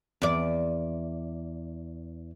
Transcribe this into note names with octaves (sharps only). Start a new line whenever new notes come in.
E2 D5